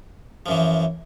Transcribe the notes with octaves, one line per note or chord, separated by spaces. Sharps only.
F#2 E3 F3